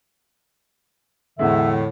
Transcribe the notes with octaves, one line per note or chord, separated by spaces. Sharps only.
E2 A2 D3 G#3 E5